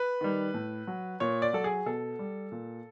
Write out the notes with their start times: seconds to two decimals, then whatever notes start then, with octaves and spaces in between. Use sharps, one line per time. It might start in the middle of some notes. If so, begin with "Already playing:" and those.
Already playing: B4
0.21 D#3 G3
0.54 A2
0.87 F#3
1.20 A#2 C#5
1.42 D5
1.53 F#3 A4
1.64 G#4
1.86 B2 A4
2.19 G3
2.52 A#2